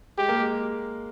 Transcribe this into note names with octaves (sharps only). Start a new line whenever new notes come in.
G#3 G4
A#3
G#3